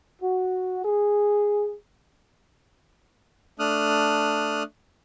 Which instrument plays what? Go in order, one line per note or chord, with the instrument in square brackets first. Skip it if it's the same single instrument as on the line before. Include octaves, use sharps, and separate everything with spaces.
[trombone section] F#4
G#4
[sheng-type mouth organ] A3 D4 D#6 F6 F#6